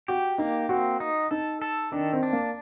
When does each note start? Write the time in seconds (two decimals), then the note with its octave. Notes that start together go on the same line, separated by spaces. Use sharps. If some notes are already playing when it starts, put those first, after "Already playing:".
0.08 F#4 G4
0.38 A#3 D#4
0.69 C4 F#4
1.00 D#4
1.31 D#4 A4
1.62 A4
1.92 D#3 D4
2.13 C4
2.23 D4
2.33 A#3